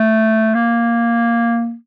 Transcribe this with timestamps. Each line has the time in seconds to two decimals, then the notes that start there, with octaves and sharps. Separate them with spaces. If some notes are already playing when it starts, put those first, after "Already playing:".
Already playing: A3
0.55 A#3